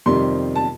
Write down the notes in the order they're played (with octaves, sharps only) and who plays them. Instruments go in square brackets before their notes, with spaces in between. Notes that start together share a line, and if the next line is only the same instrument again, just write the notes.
[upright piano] F2 C3 D#3 G3 C6
A5